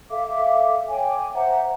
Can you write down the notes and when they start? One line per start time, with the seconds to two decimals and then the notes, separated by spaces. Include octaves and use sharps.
0.10 A4 E5 F5 D6
0.87 C#5 G5 G#5 D6
1.34 C5 E5 F#5 A#5